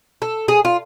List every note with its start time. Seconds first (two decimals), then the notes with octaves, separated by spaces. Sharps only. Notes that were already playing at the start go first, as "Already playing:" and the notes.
0.22 A4
0.48 G#4
0.65 F4